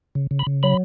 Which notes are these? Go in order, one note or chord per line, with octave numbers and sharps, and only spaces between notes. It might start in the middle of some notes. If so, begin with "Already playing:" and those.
C#3
C#3
B5
C#3
F#3 B5